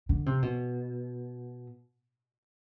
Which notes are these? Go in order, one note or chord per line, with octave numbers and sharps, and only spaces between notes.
D3
C3
B2